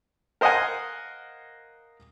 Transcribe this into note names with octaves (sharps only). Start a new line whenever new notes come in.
A#4 C5 D#5 F5 F#5 G#5